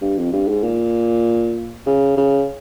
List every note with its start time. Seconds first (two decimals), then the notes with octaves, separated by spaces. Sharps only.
0.01 G2
0.17 F2
0.33 G2
0.48 G#2
0.64 A#2
1.86 C#3
2.17 C#3